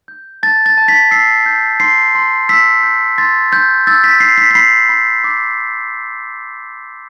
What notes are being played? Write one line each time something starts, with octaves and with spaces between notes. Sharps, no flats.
G6
A5 A6
A6
A5
B6
E6 C7
G6
C6 C7
C6
E6 B6
G6
C6 A6
C6 G6
E6 A6
B6
G6 C7
B6
B6
B5 C7
B5
D6